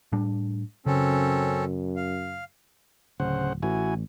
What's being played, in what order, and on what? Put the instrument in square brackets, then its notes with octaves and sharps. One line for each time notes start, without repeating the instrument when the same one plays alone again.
[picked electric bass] A2 G3 D4
[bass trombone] F#2 [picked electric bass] C#3 [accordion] C4 C#4 A4
[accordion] F5
[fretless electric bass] D1 [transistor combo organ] C#3 C5 F#5
[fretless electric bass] A1 [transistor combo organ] E4 F#4 G#5